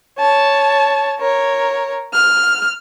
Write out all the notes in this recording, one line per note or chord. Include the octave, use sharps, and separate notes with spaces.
C#5 A5
A#4 C#5
F6